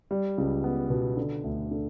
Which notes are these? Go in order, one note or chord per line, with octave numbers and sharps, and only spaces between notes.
G3
C#2
B3
B2
D3
D2
D3